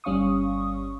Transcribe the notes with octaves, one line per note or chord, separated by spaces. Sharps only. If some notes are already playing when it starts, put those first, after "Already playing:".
G1 G3 C#4 F5 C#6 D#6